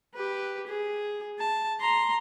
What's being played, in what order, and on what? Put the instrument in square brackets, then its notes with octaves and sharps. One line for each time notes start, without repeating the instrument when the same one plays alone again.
[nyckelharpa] G4 B4
G#4
A5
A#5 C6